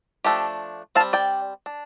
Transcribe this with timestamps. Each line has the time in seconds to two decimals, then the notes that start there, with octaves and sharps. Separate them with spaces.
0.25 F3 A3 D4 G4
0.95 C4 F5 A5
1.00 G3
1.13 D5 G5
1.66 D4